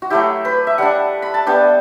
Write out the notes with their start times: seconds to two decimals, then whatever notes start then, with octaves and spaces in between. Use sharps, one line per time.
0.02 F#4
0.10 F#3 A3 E4 G4
0.45 B4
0.67 E5
0.78 G3 D4 F#5
1.22 B5
1.34 A5
1.46 G3 B3 D4 G5